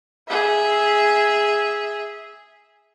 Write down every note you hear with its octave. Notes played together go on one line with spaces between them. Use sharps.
G#4 E5